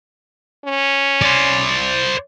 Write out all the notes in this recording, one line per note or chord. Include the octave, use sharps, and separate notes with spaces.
C#4
C5 D5